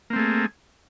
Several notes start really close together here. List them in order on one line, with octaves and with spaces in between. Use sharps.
A#3 C4 A3 G#4